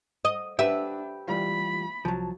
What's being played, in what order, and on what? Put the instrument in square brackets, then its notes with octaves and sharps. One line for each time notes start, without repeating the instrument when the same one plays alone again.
[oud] D#5
[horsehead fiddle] D4 [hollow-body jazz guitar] G4 B4 [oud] E5
[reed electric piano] E3 G3 F4 [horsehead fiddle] B5
[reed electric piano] C2 A5 [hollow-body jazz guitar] F3 F#3